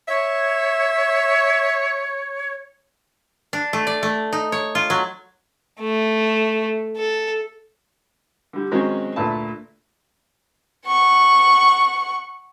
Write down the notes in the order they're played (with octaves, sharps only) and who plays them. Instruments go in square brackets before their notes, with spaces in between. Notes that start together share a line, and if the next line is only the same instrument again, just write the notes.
[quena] C#5 [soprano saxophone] E5
[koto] D4
A3
D5
A3
D#4
C#5
F4
F#3
[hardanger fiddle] A3
A4
[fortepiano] D3 G3
D#3 F#3 G#3 C4 C#4
D2 A#2 A3 B4 E5 A5
[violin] F#5 C#6